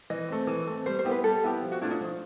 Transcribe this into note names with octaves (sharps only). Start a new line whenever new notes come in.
E3 D#5
A3 C4
E3
A3 C4
G3 C5
C5
B3 E4 G4
B4
G3 A4
B3 E4 G4
F3
F#4
A3 D4 E4 F4
D#4
F3